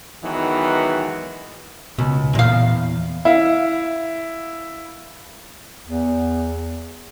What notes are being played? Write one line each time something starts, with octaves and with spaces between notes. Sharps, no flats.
D#3 E3 F#3 G#3 B3
C#2 B2
E2 A#2 F5
E4 F5
E2